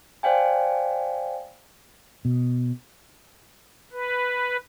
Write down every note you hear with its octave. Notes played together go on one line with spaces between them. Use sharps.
C5 D5 F5 G5 G#5
B2
B4